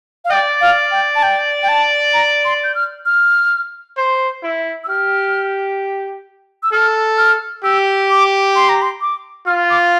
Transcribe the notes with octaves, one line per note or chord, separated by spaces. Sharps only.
F5
D5 G5
F5
G5
A5
G5
G5
A5
A#5
C6
G6
F6
F6
C5
E4
E6
G4 F6
E6
A4 F6
F6
G4 E6
D6
C6
A#5
C6
D6
F4 F6
D6